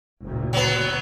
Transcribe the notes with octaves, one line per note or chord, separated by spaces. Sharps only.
F#1 D2 A#2
F#3 B3